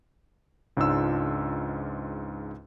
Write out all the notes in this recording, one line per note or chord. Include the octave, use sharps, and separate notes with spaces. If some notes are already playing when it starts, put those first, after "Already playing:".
C#2 G#2 D4 F4 E6